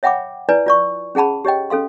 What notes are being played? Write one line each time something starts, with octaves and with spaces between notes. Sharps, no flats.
C#5 E5 F#5 G5 B5 D6
E4 B4 D5 G#5
F4 D5 C#6
C#4 G#4 F#5 A5 B5
G4 C#5 D#5 G5
C#4 A4 F5 C6